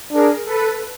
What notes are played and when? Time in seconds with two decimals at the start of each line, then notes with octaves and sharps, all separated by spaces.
0.13 D4 G#4 A#4
0.45 A4 B4